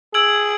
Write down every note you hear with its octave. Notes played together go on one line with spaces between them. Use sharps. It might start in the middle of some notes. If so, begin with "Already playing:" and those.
G#4 E6 G#6 D7 F#7